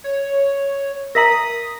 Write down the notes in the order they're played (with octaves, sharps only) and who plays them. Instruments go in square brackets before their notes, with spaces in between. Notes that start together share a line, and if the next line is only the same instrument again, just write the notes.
[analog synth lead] C#5
[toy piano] A#4 E5 A#5 [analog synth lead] D#6 [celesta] A#6 B6 F#7